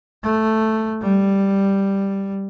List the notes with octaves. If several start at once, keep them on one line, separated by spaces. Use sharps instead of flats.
A3
G3